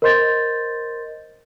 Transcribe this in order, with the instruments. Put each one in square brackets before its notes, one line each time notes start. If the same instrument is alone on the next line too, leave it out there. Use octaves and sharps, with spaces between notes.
[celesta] A#4 C5 D#5 C6 G6 A6